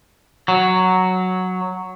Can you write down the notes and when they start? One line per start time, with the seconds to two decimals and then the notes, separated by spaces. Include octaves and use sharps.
0.48 F#3